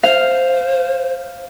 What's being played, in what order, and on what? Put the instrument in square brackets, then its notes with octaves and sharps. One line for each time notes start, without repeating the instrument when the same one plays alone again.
[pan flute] C5 [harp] F5